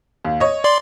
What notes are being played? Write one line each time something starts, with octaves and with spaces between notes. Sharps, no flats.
D#2
C#5 D#5
D5 C6